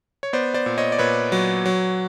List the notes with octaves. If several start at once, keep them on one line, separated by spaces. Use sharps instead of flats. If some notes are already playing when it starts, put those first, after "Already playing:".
C#5
B3 C5 D5
C5 D5
A#2
C#5 D#5
D5
A#2 B4 C#5
F#3
F#3